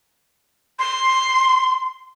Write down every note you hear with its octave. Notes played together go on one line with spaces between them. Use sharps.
C6